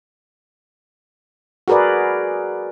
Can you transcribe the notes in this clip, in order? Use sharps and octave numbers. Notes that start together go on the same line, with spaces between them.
F#4 G#4 A#4 B4 D5